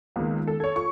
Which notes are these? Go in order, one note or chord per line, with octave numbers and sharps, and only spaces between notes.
C#2 D#3 G#3 A#3 B3
A4
A4 C#5 G#6
F4 A4 C#6